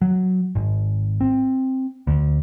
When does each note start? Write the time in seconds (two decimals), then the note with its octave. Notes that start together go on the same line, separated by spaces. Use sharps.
0.02 F#3
0.55 G#1
1.21 C4
2.07 D2